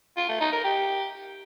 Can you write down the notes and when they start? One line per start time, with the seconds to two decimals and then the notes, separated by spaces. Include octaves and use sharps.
0.17 F4
0.29 A3
0.41 D#4
0.52 A#4
0.64 G4